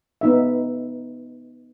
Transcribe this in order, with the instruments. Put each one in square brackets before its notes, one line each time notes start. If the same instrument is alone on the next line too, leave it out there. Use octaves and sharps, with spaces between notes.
[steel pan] B3 D#4 E5